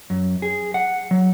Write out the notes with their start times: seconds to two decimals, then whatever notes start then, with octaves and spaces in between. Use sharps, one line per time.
0.10 F#2
0.42 G#4
0.74 F#5
1.11 F#3